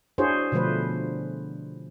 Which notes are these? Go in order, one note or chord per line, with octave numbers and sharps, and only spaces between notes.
D4 E4 F#4 G#4 C5 C#5
B2 D3 F3 A3 B4 C5